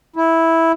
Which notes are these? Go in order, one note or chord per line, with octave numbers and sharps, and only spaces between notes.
E4